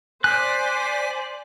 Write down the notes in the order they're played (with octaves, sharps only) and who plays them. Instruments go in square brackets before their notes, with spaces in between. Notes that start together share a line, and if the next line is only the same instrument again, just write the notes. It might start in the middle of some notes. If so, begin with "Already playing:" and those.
[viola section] C5 D5 [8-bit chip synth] G#5 B6 [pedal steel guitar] F#6